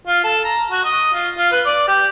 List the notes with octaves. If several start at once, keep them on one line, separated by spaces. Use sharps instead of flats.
F4
A4
A#5
F#4
D#5
F4
F4
B4
D5
G4